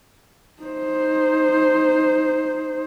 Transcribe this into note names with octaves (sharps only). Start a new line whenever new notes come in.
D#4 C5